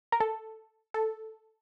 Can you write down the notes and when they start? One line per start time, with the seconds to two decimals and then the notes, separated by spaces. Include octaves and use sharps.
0.12 A#4
0.20 A4
0.94 A4